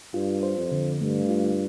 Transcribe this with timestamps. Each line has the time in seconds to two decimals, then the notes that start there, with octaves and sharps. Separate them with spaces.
0.14 G2 F4
0.43 C5
0.57 F2
0.72 D3
1.01 G2 A3
1.29 F4